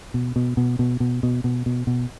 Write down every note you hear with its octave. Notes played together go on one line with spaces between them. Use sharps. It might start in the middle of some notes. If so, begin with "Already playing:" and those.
B2
B2
B2
B2
B2
B2
B2
B2
B2